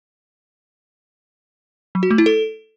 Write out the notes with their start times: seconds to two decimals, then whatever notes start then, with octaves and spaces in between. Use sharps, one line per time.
1.95 F#3
2.03 F#4
2.11 A3
2.18 E4
2.26 A4